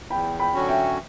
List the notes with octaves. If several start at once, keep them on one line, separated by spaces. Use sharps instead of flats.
E2 G5 B5
G5 B5
D3 F#3 C#4 F#4
E5 G5